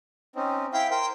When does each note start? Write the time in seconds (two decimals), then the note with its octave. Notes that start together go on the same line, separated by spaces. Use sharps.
0.36 C4 C#4 D#4
0.73 E4 F5 G5 G6
0.90 A#4 C5 G5